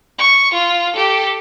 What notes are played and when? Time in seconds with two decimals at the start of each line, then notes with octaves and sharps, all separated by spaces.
0.18 C#6
0.54 F4
0.94 G4 A4